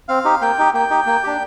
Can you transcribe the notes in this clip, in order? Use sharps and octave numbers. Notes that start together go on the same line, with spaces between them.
C4 F5
D#4 G4
A#3 G5
D#4 G4
A#3 G5
D#4 G4
A#3
D4 G4